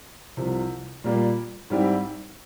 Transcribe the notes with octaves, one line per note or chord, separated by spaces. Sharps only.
C2 C3 F3
A#2 G3 A#3
G#2 G3 C4 E4 G4